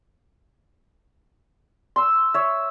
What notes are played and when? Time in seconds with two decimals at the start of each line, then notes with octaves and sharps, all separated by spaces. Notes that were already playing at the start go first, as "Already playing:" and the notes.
1.96 C6 E6
2.34 C#5 E5